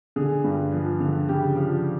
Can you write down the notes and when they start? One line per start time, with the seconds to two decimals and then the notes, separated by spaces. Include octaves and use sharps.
0.16 D3 G#4
0.44 G2
0.72 F3
1.00 D3
1.29 C#3 G4
1.56 F3